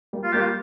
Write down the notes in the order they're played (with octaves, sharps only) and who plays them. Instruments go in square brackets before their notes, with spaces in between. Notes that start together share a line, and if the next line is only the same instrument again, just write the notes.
[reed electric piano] G3 A#3
[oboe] F4
[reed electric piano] G3 A#3 [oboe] G4
[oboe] F4